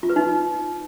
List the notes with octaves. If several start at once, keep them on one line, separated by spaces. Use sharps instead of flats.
F4
B4
D#4